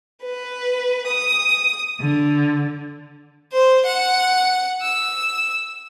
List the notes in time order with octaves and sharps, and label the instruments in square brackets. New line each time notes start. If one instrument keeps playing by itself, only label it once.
[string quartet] B4
D#6
D3
[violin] C5
F#5
E6